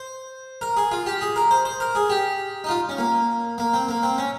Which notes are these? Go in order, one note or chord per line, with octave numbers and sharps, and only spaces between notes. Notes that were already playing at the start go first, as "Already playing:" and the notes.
Already playing: C5
A#4
G#4
F4
G4
G#4
A#4
C5
C5
A#4
G#4
G4
D#4
F4
C#4
A#3
A#3
C4
A#3
C4
C#4